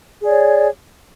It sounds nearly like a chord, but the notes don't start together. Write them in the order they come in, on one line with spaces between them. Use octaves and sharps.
G#4 D5 C#5